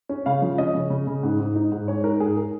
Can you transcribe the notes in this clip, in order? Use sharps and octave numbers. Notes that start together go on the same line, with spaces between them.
C#4
C#3 F5
F3
C#4 D#5
C#3
C#3
C#3
G#2
G#2
D#4
G#2
G#3 C#5
D#4 A#4
G#2 G#4
A#4